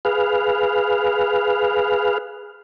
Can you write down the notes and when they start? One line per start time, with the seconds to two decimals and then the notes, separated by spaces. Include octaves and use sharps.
0.05 G#4 B4 F5